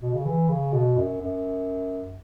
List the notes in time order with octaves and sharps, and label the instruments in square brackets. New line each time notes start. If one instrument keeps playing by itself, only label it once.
[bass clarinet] B2
C#3
E3
C#3
B2
F#2
F#2